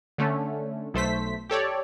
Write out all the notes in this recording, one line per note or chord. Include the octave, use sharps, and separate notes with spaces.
D3 A3 C#4
B1 A3 C5 B6
G4 A4 C#5 D5